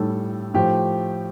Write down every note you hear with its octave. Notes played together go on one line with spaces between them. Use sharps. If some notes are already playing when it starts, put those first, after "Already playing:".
Already playing: A2 G3 A4
A2 F3 A3 G4